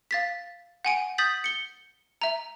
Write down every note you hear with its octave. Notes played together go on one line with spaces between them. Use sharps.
F5 A6 B6
F#5 G#5 D7
D#6 G6 A6 B6 F#7
C#7 G7
E5 A#5